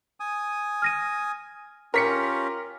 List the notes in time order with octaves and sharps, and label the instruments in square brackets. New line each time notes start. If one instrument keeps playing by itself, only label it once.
[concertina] G#5 D#6
[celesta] F6 A#6 D#7
[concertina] C#4 F4 G4 [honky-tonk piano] A#4 B6 C#7